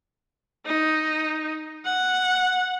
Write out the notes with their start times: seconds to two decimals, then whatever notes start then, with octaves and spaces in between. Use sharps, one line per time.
0.66 D#4
1.85 F#5